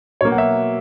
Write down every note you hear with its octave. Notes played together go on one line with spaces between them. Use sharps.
B2 F#3 A#3 C#5
F#5
E5